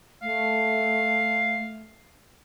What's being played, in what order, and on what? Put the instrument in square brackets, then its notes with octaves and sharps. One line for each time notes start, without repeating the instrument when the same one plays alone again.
[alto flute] A3 [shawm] F5